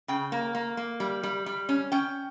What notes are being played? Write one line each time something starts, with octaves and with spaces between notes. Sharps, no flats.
C#3 G5
A#3
A#3
A#3
G3
G3
G3
C#4
C#4 G5